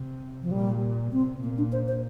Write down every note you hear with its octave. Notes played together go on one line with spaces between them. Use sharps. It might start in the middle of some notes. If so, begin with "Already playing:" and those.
Already playing: C3
F3
A#2 G3
C3 C4
A#2 A#3
D4
C5
C5